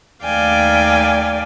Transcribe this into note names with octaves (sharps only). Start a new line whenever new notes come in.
D#2 A3 D5 F5 G5 G#5